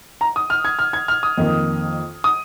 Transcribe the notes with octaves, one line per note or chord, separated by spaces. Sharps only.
A#5
D#6
F6
G#6
F6
G#6
F6
D#6
F2 D#3 A#3
D#6